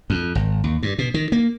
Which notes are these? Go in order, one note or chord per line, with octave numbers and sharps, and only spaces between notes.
F2
G#1
D#2
G2
B2
D#3
A#3